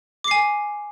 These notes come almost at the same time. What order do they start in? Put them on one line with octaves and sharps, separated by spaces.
D6 C7 G#5